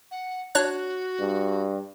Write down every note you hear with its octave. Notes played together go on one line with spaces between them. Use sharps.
F#5
D4 F#4 C#5 F#6
G2